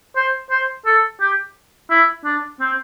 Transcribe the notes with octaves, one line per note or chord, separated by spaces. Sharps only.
C5
C5
A4
G4
E4
D4
C4